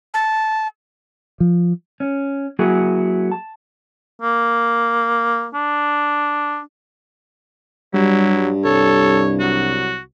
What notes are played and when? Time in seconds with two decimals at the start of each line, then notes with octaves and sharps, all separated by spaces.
0.14 A5
1.40 F3
2.00 C#4
2.59 F#3 A#3 E4 F#4 G#4
3.32 A5
4.22 A#3
5.54 D4
7.94 G2 F#3 G3 E4
8.64 C2 A4 C#5
9.40 F#3 F#4